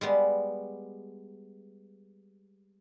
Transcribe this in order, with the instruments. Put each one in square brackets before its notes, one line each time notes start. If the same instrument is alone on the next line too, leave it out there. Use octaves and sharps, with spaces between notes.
[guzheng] G3 G#3 B3